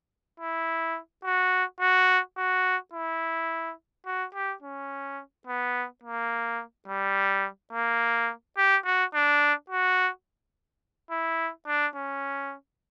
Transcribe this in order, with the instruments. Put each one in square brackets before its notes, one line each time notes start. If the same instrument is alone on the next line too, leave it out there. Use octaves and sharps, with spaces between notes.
[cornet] E4
F#4
F#4
F#4
E4
F#4
G4
C#4
B3
A#3
G3
A#3
G4
F#4
D4
F#4
E4
D4
C#4